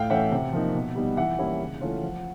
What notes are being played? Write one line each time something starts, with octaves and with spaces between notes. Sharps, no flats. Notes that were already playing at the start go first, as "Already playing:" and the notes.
Already playing: A2 F5 G5
E3 A3 C#4 E5 F#5
C3
F3 A#3 D#4
B2
G3 B3 D#4
E3 E5 F#5
G3 A#3 C#4 E4
C#3
E3 A3 C#4 F4
F3